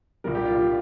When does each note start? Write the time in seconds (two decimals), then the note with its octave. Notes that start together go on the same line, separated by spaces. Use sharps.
0.24 C2 A#2 G3 A#4
0.35 G4
0.45 F4
0.56 F4